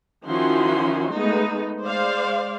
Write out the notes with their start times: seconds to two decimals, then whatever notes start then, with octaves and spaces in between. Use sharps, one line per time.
0.25 D#3 F3 C#4 E4 F#4 C6
1.13 G#3 A3 B3 D#4
1.81 G#3 C5 D5 F5